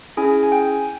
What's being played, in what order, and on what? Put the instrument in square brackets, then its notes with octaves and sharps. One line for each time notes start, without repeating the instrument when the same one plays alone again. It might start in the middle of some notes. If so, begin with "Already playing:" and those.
[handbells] C#4 E4 G#4 G#5
G#5
G5